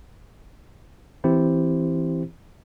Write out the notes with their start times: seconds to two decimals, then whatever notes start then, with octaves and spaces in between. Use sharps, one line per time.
1.24 E3 C4 E4 G4 C5